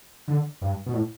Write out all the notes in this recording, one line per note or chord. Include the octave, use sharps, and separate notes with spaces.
D3
G2
B2
A2